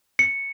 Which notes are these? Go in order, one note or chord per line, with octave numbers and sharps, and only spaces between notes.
C#7